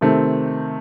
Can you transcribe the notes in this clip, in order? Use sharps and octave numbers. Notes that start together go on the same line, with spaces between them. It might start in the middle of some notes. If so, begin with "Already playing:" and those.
C3 D#3 A3 C4